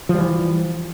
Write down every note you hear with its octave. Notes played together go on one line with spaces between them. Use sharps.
E3 F3 G3